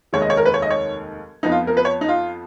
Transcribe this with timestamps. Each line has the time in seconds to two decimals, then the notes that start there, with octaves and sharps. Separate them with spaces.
0.13 F1 D#2 D#3 G#3 C#5
0.22 D#5
0.30 C#5
0.37 A#4
0.45 B4
0.54 C#5
0.62 D#5
0.70 C#5
1.43 F2 F3 B3 D#4
1.52 F4
1.67 A#4
1.77 B4
1.85 C#5
2.01 D#4
2.08 F4